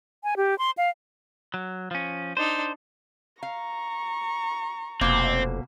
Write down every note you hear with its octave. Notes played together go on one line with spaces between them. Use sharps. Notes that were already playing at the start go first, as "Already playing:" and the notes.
G#5
G4
C6
F5
F#3
F3 C#4
D4 D#4 C5
F5 A#5 C#6
F1 B2 A#3 C4